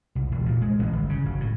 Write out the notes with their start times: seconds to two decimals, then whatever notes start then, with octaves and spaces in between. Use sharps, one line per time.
0.15 C2
0.32 E1
0.46 A#2
0.61 G#3
0.79 A1
0.92 G1
1.09 C#3
1.25 F#1
1.40 A2